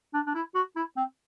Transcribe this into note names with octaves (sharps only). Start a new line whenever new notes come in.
D4
D4
E4
F#4
E4
C4